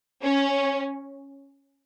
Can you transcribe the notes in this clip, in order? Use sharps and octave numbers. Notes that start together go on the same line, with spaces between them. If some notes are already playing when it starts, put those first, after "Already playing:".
C#4